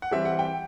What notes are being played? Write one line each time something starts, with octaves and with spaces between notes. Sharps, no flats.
F#5
E3 G3 C4 E5
F#5
G5